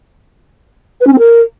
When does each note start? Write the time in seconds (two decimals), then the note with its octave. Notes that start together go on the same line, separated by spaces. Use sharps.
1.01 B4
1.07 C#4
1.13 C4
1.19 A#4